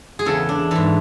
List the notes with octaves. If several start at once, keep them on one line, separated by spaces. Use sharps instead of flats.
G#4
E2 C#3 E3 A4
D4
G#2 E3 A4